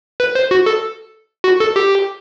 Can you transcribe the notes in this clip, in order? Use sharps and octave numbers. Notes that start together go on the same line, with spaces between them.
B4
C5
F#4
A4
F#4
A4
G4